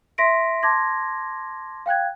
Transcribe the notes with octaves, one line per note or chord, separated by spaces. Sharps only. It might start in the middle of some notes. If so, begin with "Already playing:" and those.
E5 C6 A#6 B6 D7
A5 C6 D6 G#6 A#6
F5 G5 F#6 G#6